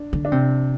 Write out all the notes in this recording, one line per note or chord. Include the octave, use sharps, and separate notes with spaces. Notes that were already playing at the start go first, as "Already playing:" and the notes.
Already playing: D4
D3
D4
C3 C4